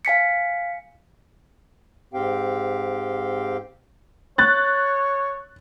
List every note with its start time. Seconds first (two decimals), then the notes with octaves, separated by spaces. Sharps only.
0.05 F5 G#5 B6 C#7
2.13 G#2 C4 G4 F5 G5
4.38 C#5 F#6 A6